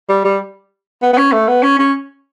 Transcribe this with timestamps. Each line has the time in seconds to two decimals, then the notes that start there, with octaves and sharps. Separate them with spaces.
0.09 G3
0.25 G3
1.02 B3
1.13 B3
1.18 C#4
1.33 A3
1.48 B3
1.63 C#4
1.79 C#4